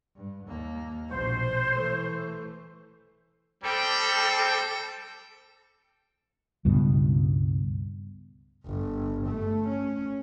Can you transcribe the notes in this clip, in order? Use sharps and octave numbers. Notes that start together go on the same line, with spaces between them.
G2
D#2 A#3
A#1 B2 C5
E3 A3
G3 C4 A4 G5
C#2 G2 B2
G1
A3
C#4